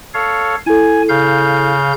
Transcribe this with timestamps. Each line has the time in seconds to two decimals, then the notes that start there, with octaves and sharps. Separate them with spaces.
0.14 A4 C#5 F5
0.66 E4 A4 G#5
1.09 C#3 F5 G6